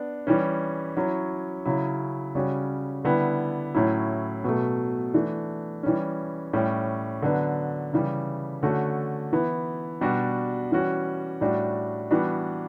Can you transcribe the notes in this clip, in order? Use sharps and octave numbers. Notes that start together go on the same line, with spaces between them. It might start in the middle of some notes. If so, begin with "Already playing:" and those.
Already playing: B3 D4
E3 G3 C#4
F#3 C#4 E4
C#3 F#3 C#4 E4
C#3 G3 C#4 F#4
D3 G3 B3 E4
A2 F#3 C#4 E4
B2 F#3 A3
E3 A3 D4
E3 G3 C#4
A2 G3 C#4
D3 F#3 B3 D4
C#3 E3 G3
D3 A3 C#4 F#4
E3 B3 E4
B2 G3 D4 F#4
E3 G3 C#4 F#4
A2 G3 D4 F#4
E3 G3 B3 D4 F#4